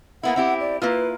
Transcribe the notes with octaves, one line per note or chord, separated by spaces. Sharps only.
A#3 B3 E4 F#5
C4 E4 G4
D5
A#3 E4 F4 B4